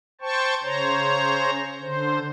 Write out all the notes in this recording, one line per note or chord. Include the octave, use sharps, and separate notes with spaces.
C5 G5 A5 C#6
C#3 C5 C#5 A#5
D3 C5